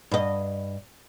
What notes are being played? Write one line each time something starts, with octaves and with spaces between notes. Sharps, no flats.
G2 D#5